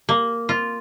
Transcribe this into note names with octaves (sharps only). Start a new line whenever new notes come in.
A#3
F4